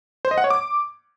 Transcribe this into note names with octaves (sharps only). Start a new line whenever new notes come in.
C5
D#5
F#5
C#5
D6